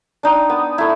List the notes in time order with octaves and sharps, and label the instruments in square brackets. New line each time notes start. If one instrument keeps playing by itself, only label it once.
[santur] D4 D#4 G5
B3
A3 E4